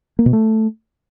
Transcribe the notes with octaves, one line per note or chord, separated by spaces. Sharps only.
A#3
B2
A3